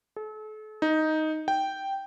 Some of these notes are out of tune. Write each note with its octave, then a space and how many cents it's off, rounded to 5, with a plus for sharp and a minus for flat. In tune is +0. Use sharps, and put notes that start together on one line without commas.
A4 -40
D#4 +5
G5 -5